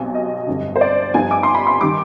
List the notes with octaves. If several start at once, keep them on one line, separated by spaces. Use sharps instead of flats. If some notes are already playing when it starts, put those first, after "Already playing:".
Already playing: B1 B2 G3 C4
D#5
G1 F2 D3
C5
D5
G2 F3 B3 D#4 G#5
D6
C6
B5
C6
D#3 G3 D6